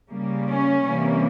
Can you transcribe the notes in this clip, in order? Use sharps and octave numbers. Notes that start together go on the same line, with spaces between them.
C#3 G3 A#3
C#4
C3 E3 G3 A#3